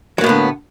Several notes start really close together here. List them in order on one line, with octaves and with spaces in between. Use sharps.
F#3 A#3 A2 B3 D3